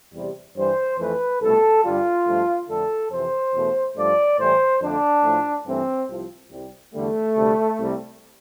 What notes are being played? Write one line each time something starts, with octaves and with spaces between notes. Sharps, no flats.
E2 C3 G3
G2 E3 G3 C5
F2 E3 A3 B4
C2 B2 A3 A4
G2 D3 G3 F4
G2 F3 A3
F2 D3 A3 A4
F2 C3 E3 C5
E2 B2 A3
G2 F3 A3 D5
A2 E3 G3 C5
F2 D3 A3 D4
A2 F3 A3
G2 E3 A3 C4
C2 C3 F3
C2 C3 G3
E2 D3 G3 A3
D2 C3 G3
C2 C3 G3